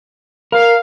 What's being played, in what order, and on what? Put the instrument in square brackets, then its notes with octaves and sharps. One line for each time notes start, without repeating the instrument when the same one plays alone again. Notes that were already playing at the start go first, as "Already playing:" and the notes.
[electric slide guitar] A#4 [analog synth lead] F5